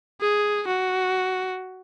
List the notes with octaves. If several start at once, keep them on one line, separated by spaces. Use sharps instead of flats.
G#4
F#4